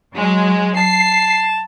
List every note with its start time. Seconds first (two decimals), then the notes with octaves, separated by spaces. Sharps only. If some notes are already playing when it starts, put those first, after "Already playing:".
0.15 F#3 G#3
0.77 A5 C7